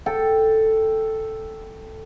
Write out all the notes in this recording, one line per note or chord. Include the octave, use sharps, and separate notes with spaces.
A4 G5